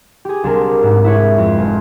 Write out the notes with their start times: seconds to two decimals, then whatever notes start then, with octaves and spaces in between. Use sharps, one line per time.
0.25 G4 G#4
0.44 C2 D4 A#4
0.83 G#2
1.04 E4 B4 C#5
1.38 F2
1.58 F1